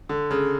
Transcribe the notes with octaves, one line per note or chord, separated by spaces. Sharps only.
D3
C#3